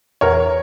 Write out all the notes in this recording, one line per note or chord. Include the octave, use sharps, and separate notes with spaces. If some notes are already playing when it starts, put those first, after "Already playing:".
E2 A#4 C#5